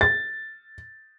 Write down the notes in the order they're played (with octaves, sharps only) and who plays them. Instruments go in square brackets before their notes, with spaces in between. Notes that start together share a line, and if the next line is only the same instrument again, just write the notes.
[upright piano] A6